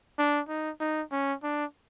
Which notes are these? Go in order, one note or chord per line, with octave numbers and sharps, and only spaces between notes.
D4
D#4
D#4
C#4
D4